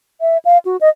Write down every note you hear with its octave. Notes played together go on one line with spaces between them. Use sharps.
E5
F5
F#4
D#5